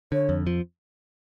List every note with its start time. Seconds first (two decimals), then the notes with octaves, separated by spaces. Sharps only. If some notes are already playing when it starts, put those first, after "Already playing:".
0.12 D3 C#5
0.29 F2
0.47 F3